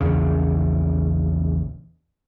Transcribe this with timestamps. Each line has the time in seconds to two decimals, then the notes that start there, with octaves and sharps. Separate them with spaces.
0.01 A#1 E2 C#3